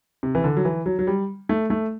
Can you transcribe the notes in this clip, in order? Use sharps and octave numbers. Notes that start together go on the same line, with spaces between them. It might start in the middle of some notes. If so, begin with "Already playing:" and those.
C3
E3
D3
F#3
E3
F#3
F#3
G3
A3
A3